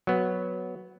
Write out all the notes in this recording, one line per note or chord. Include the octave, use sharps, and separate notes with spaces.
F#3 B3